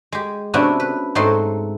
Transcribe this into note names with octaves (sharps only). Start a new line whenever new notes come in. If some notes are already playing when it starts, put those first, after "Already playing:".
G#3 G4
C3 B3 C#4 D4 E4 F#4
B4
G#2 F#3 A3 C4 D#5 C6